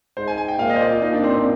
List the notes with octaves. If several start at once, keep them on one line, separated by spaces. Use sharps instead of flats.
G#2 C5
G#5
G#5
G5
A#2 F5
D#5
C5
D5
F4
A#2 D#4
D4
C4
C4